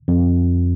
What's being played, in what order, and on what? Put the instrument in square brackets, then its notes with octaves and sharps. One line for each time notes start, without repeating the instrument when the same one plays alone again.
[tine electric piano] F2